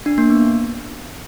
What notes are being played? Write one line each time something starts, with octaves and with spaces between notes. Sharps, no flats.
D4
A#3
B3